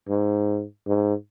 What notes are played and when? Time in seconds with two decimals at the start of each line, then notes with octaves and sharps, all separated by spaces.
0.09 G#2
0.87 G#2